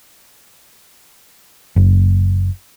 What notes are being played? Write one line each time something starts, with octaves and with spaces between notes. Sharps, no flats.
F#1